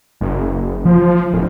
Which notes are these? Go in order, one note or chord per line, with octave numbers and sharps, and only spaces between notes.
F#1
F3
D1